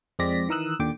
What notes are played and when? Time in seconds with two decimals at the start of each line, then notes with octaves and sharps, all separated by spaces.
0.19 F2 G#3 C4 D5 A#6 B6
0.49 D#3 E3 A#4 D#6 E6 F#6
0.80 D#2 A#2 D3 G5 D6